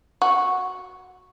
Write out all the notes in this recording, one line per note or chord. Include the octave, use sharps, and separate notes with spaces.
F#4